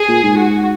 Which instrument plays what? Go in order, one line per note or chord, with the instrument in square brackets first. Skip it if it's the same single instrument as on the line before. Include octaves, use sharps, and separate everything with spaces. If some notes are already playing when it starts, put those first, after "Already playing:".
Already playing: [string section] G#4
[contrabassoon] A#2
G#2
[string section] F#4